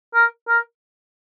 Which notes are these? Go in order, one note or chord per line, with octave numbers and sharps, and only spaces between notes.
A#4
A#4